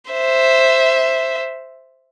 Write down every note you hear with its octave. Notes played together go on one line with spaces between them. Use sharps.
C5 E5